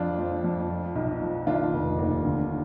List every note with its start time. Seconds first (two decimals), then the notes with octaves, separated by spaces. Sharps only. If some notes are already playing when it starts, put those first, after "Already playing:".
Already playing: F2 D4 F4
0.19 F3
0.44 F2
0.69 F3
0.95 B1
1.22 F3
1.47 D#3 D4 F4
1.73 F1
1.99 D#2
2.25 D3